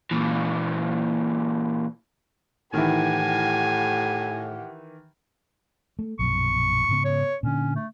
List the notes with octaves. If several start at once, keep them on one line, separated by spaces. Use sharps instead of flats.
A#2 E3
A2 D#3 E3 G4 F#5 G#5
A3
A#1 F#2 B2 C#6
G#2 C#3 B3
C#5
A#2 D3 C#4
A3